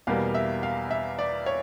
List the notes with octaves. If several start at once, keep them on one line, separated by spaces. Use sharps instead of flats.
E2 B2 G3 A#3 F5
E5
F5
E5
D5
C#5